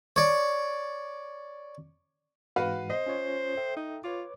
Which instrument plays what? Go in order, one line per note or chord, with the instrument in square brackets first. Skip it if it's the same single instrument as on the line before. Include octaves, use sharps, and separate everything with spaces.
[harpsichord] C#5 D5
[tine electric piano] G#2 E3 G#3 [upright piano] F#4 B4 F5
[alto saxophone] C5 [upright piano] D#5
[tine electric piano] C#4 F4 C#5
A4 E5 G5
[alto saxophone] D#4
[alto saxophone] F4 [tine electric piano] B4 C#5 D6